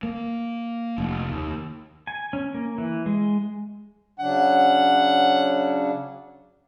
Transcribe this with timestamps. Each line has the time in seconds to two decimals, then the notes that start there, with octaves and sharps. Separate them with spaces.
0.03 A#3
0.98 F1
1.29 D#2
2.07 G#5
2.33 C#4
2.54 A#3
2.78 E3
3.06 G#3
4.19 C#3 F#3 D4 F#5